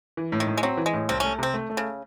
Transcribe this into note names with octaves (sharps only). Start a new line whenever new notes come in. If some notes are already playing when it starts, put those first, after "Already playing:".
E3
A2
D#3
A2
G#3
F#3 C4
E3
G#3
A2
C2 C4
A3 C#4
C3 C4
A3
A3
C#3